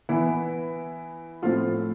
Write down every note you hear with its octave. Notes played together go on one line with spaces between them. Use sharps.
E3 B3 E4
A2 F3 C4 F4 A4